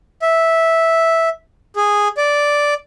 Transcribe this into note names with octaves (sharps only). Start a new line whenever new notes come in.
E5
G#4
D5